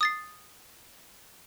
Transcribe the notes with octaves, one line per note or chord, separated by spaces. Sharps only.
D#6 A6 C7